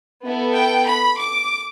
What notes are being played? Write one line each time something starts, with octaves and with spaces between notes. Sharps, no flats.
B3 E4 A4
G5
B5
D6